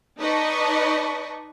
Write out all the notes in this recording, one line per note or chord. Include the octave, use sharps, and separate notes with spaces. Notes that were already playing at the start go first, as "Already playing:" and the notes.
D#4 B4 D5 D#5 A5 C#6